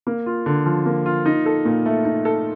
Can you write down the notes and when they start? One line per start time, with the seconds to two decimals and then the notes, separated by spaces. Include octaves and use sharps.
0.07 A#3
0.26 F4
0.46 D3
0.66 F3
0.86 A#3
1.06 F4
1.26 D#4
1.46 A4
1.65 A#2
1.86 A3
2.05 D#4
2.25 A4